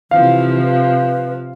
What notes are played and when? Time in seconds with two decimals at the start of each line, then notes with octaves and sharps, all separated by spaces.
0.11 C3 E3 F3 F5
0.62 B4